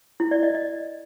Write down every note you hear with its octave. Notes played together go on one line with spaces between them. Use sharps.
E4
D5
D#5
D#5